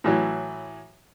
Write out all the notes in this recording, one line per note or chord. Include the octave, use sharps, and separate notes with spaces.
A2 E3 F#3